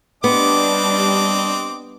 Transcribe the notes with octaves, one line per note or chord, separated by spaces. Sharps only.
G3 B3 C4 D4 D#5 D6